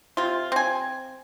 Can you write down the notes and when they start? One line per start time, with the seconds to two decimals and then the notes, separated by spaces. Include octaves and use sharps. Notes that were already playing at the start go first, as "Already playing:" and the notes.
0.17 C3 F4
0.52 C4 G#5